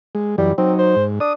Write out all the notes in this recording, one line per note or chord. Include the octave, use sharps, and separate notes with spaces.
G#3
F#2 E3 G3
F#3 C4 D#4
C5
G#2
D4 D#6